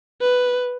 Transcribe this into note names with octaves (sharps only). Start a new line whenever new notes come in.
B4